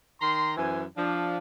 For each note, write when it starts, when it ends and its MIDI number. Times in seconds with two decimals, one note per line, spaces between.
0.21 0.52 51
0.21 0.52 82
0.21 0.52 84
0.57 0.83 42
0.57 0.83 52
0.57 0.83 72
0.57 0.83 80
0.96 1.37 53
0.96 1.37 62